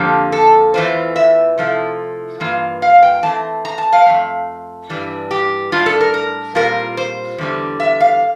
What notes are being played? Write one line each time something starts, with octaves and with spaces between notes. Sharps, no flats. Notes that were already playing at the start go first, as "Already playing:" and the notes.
Already playing: F2 D3 F3 A#3 G4
A4
E2 E3 A3 D4 F4 C5
E5
C3 F3 A3 E4
G2 E3 A#3 F4
F5
G5
E3 A3 C4 A5
A#5
A5
F5
F2 E3 A3
G2 E3 G3 D4
G4
A2 G3 D4 F4
A4
A#4
A#4
A#2 G3 C4 F4 A#4
C5
E2 D3 G3
E5
F5